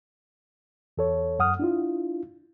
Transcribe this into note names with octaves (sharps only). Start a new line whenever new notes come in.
E2 A4 C#5
F#2 F#5 D#6 F6
D4 E4 F4